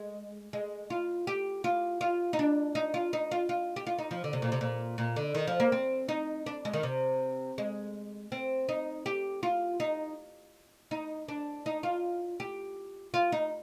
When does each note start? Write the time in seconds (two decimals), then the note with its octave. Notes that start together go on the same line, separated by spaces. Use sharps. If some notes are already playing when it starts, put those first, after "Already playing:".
Already playing: G#3
0.53 G#3
0.90 F4
1.27 G4
1.64 F4
2.01 F4
2.33 D#4
2.39 D4
2.75 D#4
2.94 F4
3.13 D#4
3.31 F4
3.49 F4
3.76 G4
3.87 F4
3.99 D#4
4.11 F3
4.24 D3
4.33 C3
4.42 A#2
4.52 C3
4.61 A#2
4.98 A#2
5.16 D3
5.35 D#3
5.47 F3
5.60 A#3
5.72 C4
6.09 D#4
6.46 D4
6.65 G#3
6.73 D#3
6.83 C3
7.58 G#3
8.32 C4
8.69 D#4
9.06 G4
9.43 F4
9.80 D#4
10.91 D#4
11.28 D4
11.66 D#4
11.83 F4
12.40 G4
13.14 F4
13.32 D#4